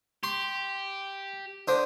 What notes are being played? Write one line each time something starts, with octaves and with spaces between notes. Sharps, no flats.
G4 C6
D3 C5 D#6